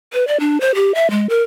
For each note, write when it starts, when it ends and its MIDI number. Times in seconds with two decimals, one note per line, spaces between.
0.13 0.27 71
0.28 0.40 74
0.40 0.58 62
0.61 0.75 72
0.75 0.95 67
0.95 1.10 76
1.11 1.27 56
1.30 1.42 70